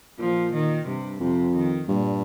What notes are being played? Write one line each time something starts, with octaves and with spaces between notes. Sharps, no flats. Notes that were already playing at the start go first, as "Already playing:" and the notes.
A#2 F3
D#3
G2 C3
F2 C3
D#3
G2 A#2